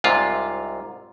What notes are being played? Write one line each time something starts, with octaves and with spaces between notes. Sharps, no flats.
C2 G#2 C3 F4